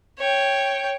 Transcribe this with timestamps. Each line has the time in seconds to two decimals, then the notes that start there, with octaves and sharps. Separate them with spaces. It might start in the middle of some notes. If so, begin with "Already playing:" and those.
0.18 C#5 G5